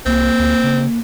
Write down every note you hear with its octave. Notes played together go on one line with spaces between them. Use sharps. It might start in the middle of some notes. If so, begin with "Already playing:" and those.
C2 A#3 C4
D2
C#3